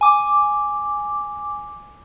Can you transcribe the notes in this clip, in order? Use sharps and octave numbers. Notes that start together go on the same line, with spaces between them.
G#5 D6